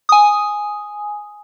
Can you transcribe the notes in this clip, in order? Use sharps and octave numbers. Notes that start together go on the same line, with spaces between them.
G#5 D#6